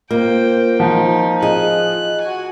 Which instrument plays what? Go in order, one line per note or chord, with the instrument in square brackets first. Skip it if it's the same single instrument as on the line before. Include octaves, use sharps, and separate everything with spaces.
[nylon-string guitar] A#3 [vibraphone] F4 [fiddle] C5 G5
[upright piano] F3 [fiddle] D#4
[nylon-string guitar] G#4 [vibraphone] D#5 [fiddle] F#6
[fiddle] F#4 G#5